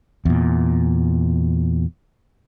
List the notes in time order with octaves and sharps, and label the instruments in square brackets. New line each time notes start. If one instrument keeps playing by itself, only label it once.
[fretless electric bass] E2 A#2